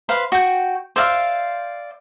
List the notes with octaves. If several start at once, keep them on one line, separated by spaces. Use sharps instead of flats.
B4 C5 F5 C6
F#4 G5
C5 D5 E5 F5